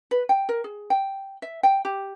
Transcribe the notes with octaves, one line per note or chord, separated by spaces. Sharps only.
B4
G5
A#4
G#4
G5
E5
G5
G4